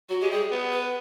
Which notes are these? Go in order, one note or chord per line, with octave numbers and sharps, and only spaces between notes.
F#3 F#4
G#3 G4
G3 G#4
B3
B4